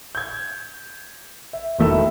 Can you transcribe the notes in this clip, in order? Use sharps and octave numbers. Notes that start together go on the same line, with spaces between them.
G6 G#6
E5
E1 D#3 A3 E4 E6